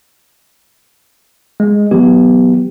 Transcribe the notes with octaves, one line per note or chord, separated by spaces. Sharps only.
G#3
E3 F#3 B3 G4